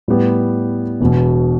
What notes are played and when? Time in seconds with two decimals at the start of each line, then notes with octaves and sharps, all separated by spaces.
0.08 A2 G3 B3 G4
1.01 E1 E2 B2